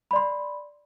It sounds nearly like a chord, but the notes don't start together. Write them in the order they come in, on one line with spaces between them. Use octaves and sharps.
B5 D5 C6